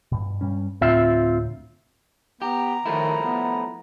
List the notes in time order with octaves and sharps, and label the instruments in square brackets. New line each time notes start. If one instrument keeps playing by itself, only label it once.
[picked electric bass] G2 B2
G2 G3 C#4
[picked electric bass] D2 A2 [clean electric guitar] C4 F4 E5
[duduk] B3 [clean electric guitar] G4 [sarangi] A#5
[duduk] D#3 [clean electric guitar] F3 A3 E4
[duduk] B3